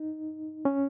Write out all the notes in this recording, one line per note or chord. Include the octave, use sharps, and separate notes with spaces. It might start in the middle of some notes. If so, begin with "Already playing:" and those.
Already playing: D#4
C#4